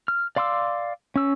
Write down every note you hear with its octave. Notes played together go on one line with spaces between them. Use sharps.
F6
D5 F5 C6 D6 E6
C#4 E6